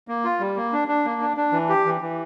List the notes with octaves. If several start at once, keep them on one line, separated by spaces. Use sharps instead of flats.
A#3
F4
G3
A#3
D4
D4
A#3
D4
D4
E3
G4
E3
E3